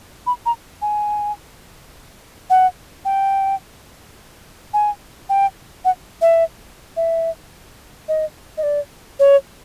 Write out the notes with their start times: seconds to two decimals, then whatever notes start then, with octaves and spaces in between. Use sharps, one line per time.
0.27 B5
0.46 A#5
0.82 G#5
2.50 F#5
3.05 G5
4.74 G#5
5.29 G5
5.85 F#5
6.22 E5
6.97 E5
8.09 D#5
8.58 D#5
8.63 D5
9.19 C#5